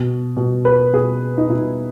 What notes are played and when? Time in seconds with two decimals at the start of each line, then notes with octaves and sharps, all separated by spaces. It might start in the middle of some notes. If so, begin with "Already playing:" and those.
Already playing: B2
0.37 B2
0.65 B4
0.93 B2 G#4
1.38 D#4
1.49 B2 E4